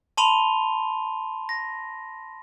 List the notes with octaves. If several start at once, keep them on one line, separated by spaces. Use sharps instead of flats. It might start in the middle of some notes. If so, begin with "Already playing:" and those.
A5 B5 C6 D#7 F7 G7
A#6